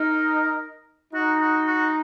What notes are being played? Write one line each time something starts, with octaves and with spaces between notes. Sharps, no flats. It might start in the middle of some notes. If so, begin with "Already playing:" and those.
Already playing: D#4 A#4
D#4 F#4
F#4
F#4